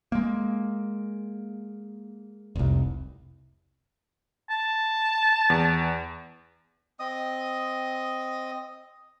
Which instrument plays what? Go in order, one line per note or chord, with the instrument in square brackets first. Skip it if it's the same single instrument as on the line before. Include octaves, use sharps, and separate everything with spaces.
[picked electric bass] G#3 A#3
F1 C2
[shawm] A5
[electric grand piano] E2
[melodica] C4 D#5 D#6